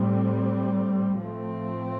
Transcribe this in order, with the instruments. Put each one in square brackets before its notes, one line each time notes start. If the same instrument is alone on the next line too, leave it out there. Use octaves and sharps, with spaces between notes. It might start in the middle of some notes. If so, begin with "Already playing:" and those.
Already playing: [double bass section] A2 G3 C4
A2 F3 A3 C4